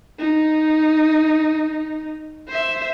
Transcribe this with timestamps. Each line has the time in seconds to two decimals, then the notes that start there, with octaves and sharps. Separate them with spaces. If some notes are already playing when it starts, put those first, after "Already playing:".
0.19 D#4
2.48 C5 E5